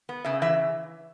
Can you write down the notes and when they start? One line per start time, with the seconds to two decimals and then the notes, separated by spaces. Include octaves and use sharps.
0.09 B3
0.25 C#3 E5
0.42 E3 E5